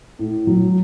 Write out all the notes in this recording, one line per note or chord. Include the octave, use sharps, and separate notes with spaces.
A2
F#3